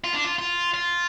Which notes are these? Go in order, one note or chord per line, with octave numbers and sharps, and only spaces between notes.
F4
D4
F4
F4
F4